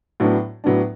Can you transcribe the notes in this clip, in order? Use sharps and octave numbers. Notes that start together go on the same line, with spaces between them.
A2 F#3 B3 D4
A2 F#3 B3 D4